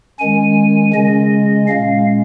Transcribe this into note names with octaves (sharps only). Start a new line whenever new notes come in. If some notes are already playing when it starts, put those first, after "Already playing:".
D#3 G#3 C#4 G#5
C#3 G#3 C#4 D#5
A#2 G#3 C#4 F5